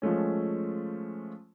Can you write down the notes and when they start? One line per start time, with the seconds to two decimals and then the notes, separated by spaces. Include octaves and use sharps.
0.02 F3 G#3 A3 C#4